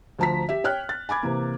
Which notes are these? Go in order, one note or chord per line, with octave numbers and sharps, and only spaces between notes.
D2 F3 A5 A#5 B6
G4 E5
C#5 G5 F6 F#6
A6
G#5 B5 D6 G#6
C3 E3 A#3